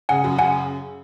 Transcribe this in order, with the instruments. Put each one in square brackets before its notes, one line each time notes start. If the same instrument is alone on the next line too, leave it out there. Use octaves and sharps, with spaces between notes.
[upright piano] C#3 [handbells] F#5 G#5
[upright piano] F#2
[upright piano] C#3 [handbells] F#5 G#5